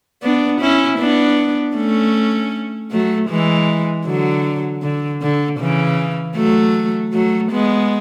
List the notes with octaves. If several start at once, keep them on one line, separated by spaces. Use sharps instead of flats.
B3 D4
C#4 E4
B3 D4
A3 C#4
F#3 A3
E3 G#3
D3 F#3
D3
D3
C#3 E3
F#3 A3
F#3 A3
G#3 B3